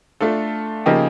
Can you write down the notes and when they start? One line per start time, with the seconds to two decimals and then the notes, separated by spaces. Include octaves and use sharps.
0.21 A3 D4 F4 A4
0.86 C#3 F3 A#3 D#4 G4